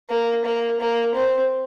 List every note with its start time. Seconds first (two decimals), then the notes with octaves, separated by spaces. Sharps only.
0.09 A#3
0.45 A#3
0.80 A#3
1.15 C4